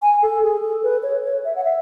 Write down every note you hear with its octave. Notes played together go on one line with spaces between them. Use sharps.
G#5
A4
G#4
A4
B4
C#5
C#5
E5
F#5
E5